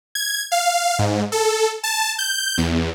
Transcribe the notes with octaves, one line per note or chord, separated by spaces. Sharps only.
G#6
F5
G#2
A4
A5
G6
E2